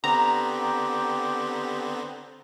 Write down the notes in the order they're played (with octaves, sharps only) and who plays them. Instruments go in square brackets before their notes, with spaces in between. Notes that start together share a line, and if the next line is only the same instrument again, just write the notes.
[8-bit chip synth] D3 B3 C4 [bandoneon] G4 [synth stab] A#5